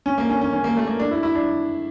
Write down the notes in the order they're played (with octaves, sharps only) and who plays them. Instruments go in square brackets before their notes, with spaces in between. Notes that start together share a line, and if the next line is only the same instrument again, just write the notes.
[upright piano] C#4
A#3
C#4
C#4
C#4
A#3
A3
A#3
D4
E4
E4
D4